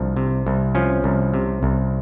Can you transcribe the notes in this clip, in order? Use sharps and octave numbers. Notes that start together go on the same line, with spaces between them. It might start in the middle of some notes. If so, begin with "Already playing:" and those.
Already playing: C2 F3 D4
C3
C2
F3 C#4
C2
C3
C2